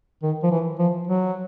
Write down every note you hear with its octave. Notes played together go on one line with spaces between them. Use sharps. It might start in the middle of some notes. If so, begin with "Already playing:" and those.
D#3
F3
E3
F3
F#3